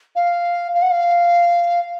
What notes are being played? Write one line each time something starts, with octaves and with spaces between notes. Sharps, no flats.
F5
F5
F#5
F5